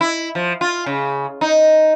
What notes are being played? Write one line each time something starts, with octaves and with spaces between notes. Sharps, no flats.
E4
F3
F4
C#3
D#4